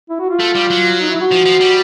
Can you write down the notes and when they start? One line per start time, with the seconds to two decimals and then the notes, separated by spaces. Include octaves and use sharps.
0.10 E4
0.20 F#4
0.30 F4
0.40 A3
0.55 G3
0.70 F#3
1.01 D#4
1.10 E4
1.21 F#4
1.31 F3
1.45 F3
1.60 G3